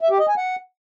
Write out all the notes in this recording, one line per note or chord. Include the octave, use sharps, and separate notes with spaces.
E5
G4
D#5
G#5
F#5